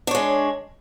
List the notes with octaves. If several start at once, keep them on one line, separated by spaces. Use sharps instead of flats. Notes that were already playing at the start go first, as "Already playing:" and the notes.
G#3 D4 C#5